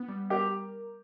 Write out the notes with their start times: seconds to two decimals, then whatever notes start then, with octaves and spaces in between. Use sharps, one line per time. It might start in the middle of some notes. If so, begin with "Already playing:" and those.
Already playing: B3
0.08 G3
0.30 G4 A#4